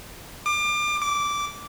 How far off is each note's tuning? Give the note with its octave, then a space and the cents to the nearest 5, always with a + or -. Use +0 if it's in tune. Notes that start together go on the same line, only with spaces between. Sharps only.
D6 +30
D6 -10